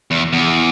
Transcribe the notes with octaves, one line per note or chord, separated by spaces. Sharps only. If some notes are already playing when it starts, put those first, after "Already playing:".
E2
E2